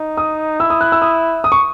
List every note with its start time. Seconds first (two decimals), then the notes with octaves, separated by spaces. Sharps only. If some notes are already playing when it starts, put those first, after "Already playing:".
Already playing: D#4
0.17 D#6
0.60 E4 E6
0.70 D#6
0.81 F#6
0.92 E6
1.02 D#6
1.44 D#6
1.52 C#6